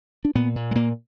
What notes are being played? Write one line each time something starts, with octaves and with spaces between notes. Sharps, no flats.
D4
A#2 B3
A#2
G#3
A#2 A#3